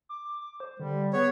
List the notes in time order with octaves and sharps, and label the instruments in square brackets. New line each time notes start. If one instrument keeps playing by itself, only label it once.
[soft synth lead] D6
D6
C5
[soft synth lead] D3 [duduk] G3
[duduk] B3 [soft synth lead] G#4 [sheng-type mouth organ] C#5